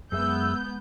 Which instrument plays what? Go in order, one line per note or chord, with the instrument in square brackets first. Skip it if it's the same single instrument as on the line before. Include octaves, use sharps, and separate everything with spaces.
[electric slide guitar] F#2 G#4 E5 [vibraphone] G#3 [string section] B3 G6 [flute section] E6